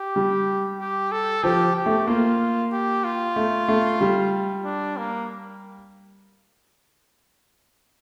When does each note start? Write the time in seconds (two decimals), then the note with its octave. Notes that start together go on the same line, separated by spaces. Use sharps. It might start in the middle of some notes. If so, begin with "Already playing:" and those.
Already playing: G4
0.16 G3
0.80 G4
1.12 A4
1.43 F3 G4
1.76 G4
1.86 A3
2.07 A#3 F4
2.72 G4
3.04 F4
3.36 A3
3.68 A3
4.01 G3
4.65 D4
4.97 A#3